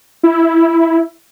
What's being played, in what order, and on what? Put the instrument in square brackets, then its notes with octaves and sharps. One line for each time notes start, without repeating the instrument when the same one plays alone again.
[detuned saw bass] E4